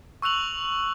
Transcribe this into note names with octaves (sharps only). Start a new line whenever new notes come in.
C#6 E6 F#6 F7 F#7